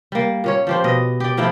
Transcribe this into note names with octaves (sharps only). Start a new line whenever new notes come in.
G3 A#3
A#2 C#4 C#5
F3 G4 C5
B2 D#5
G4 D5
A2 F3 D#4 E4